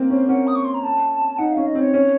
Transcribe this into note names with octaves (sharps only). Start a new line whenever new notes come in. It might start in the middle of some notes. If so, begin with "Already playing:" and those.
Already playing: A#3 C4
C#4 C5
C#4 F#5
D#6
C#6
C6
A#5
A5
D#4 F#5
C#4 F5
D#5
C4 C#5
C#4